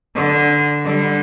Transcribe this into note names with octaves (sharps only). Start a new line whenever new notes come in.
D3
D3 G3